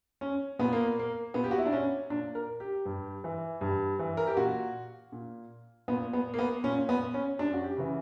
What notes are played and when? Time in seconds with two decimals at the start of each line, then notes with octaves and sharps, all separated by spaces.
0.21 C#4
0.59 A#2 B3
0.73 A#3
0.99 A#3
1.34 A#2 B3
1.44 G4
1.51 F#4
1.58 E4
1.66 D4
1.72 C#4
2.10 A#2 D4
2.35 A#4
2.60 G4
2.85 G2
3.24 E3
3.61 G2
3.99 E3
4.17 A#4
4.27 G4
4.37 A#2 F#4
5.12 A#2
5.88 A#2 B3
6.13 B3
6.34 A#3
6.39 B3
6.64 A#2 C#4
6.89 B3
7.14 C#4
7.39 F#2 D4
7.54 F#4
7.64 G4
7.77 C#3 E3